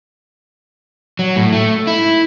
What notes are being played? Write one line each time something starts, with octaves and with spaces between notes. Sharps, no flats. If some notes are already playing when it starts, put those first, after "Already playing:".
F#3
A2
A3
E4